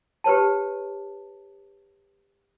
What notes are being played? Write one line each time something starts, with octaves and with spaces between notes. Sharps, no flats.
G4 B4 C#5 A5